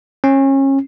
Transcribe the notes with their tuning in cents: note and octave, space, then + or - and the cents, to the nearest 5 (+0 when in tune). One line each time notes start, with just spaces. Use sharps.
C#4 -30